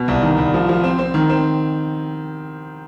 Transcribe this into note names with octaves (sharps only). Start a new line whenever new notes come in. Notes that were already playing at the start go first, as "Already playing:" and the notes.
Already playing: B2
C2
D#3
C2
F3
F3
C4
C4
D#3
C4